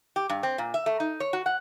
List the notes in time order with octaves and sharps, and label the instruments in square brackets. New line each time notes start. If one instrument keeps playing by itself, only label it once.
[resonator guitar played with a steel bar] G4
G2
C4
A#2
E5
A3
D#4
C#5
F#4
F#5